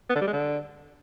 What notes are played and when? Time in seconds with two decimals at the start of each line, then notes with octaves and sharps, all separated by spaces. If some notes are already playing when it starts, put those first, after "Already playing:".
0.10 B3
0.15 D3
0.21 G3
0.27 G#3
0.33 D3